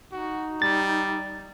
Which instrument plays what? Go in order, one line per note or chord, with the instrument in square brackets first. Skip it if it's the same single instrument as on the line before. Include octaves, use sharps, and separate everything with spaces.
[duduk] D#4 [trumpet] F#4
[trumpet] G3 [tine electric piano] A6